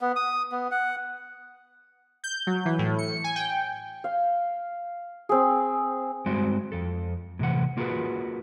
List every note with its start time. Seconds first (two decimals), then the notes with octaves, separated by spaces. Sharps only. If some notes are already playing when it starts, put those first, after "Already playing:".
0.01 B3
0.16 D#6
0.52 B3
0.71 F#5
2.24 G6
2.47 F#3
2.65 E3
2.79 A2
2.98 C#7
3.24 G#5
3.36 G5
4.04 F5
5.29 C4 G#4
6.26 G2 G#3 C4 F#4 C5
6.72 F2 A4
7.39 A2 C3 E3 F#5
7.77 A#3 F4 F#4 G#4 A#4 B4